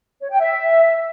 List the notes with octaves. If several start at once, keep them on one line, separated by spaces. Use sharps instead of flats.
C#5
G5
E5